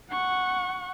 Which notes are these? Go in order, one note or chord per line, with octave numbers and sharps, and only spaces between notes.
F#5 C#6